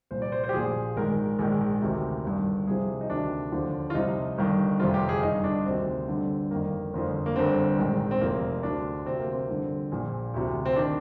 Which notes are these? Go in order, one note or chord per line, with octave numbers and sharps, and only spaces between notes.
C2 A#2 F3 C5
D5
C5
C5
G4
A#1 A#2 F3 G#4
A#1 G#2 D#3 A#4
A#1 G#2 D#3
D2 C3 D#3
G1 G2 D#3
C2 C3 F3 G#4
D#4
D2 C3 D#3 D4
D#2 D3 F3
F4
C2 C3 F3 D#4
G1 G2 D#3
G1 F2 C3 F3 F4
G4
G#4
G1 G2 D#3 D#4
D4
D2 C3 D#3 C4
G1 G2 D3
G1 F2 D#3 A#3
G1 F2 D3 F3
A#3
G1 G2 D3 C4
A#1 G#2 D#3
C4
F1 F2 C3 F3 A#3
D2 D3 F3 D4
D2 C3 F3 C4
A#3
C4
G1 G2 D3 F3
A#1 A#2 F3
D2 C3 F3
C4
D#3 D4